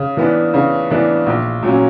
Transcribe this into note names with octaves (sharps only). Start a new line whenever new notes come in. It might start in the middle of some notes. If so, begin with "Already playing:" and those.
Already playing: C#3
E3 B3 D4
C#3
E3 B3 D4
A#1
A#2 F#3 C#4